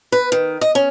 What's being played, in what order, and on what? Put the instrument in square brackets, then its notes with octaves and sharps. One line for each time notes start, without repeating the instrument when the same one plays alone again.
[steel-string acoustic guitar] B4
D#3
D#5
C#4